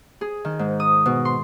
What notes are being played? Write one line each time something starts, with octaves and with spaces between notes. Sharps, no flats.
G#4
D#3
G#2
D#6
B2
C6